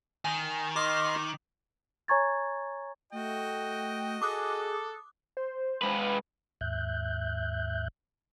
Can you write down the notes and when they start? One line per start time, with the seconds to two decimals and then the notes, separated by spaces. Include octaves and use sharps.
0.25 D#3 G#5
0.76 D#5 C6 D6 F6
2.08 C#5 G#5 A#5 C#6 G#6 A6
3.12 A3 F#4 D#5 G5
4.22 G#4 A4 D6 D#6 F#6
5.37 C5
5.82 G#3 B4
6.61 D#2 G#2 E5 F#6 G6